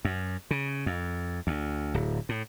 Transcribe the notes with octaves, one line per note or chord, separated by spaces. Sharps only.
F#2
C#3
F2
D2
D1
A2